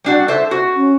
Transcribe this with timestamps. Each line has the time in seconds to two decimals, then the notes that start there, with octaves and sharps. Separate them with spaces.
0.04 G3 D4 F#4
0.28 A4 C5 E5
0.51 F#4
0.76 C#4